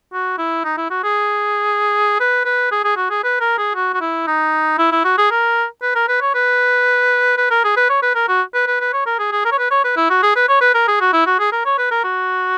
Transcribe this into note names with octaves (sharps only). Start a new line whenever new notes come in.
F#4
E4
D#4
E4
F#4
G#4
B4
B4
G#4
G#4
F#4
G#4
B4
A#4
G#4
F#4
F#4
E4
D#4
E4
E4
F#4
G#4
A#4
B4
A#4
B4
C#5
B4
B4
A#4
G#4
B4
C#5
B4
A#4
F#4
B4
B4
B4
C#5
A#4
G#4
G#4
A#4
C#5
B4
C#5
B4
E4
F#4
G#4
B4
C#5
B4
A#4
G#4
F#4
E4
F#4
G#4
A#4
C#5
B4
A#4
F#4